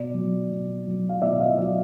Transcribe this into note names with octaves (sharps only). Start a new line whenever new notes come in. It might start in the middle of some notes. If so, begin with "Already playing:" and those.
Already playing: B2 D5
F#3
B2
F#3
F5
B2 D5 E5
D#5 F5
F#3 D5 E5